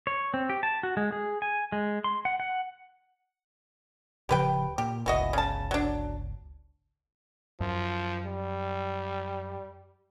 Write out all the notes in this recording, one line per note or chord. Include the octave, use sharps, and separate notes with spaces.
C#5
C4
G4
A5
F#4
G#3
G#4
G#5
G#3
C6
F#5
F#5
D1 C#3 F3 G4 B4 G5
A#2 G4
G1 C#2 E3 F#4 D#5
C#3 A5
F#3 D4
F#2 F3
G3